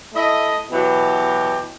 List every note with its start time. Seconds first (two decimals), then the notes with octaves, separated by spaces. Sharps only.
0.13 A3 E4 D#5
0.71 B2 E3 F#3 G4